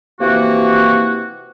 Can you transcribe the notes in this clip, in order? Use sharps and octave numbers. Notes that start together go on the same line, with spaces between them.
C3 E3 F3 A#3 F#4